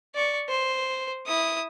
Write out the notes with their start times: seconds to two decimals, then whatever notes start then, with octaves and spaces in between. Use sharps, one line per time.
0.15 D5 C#6
0.49 C5
1.27 E4 D#6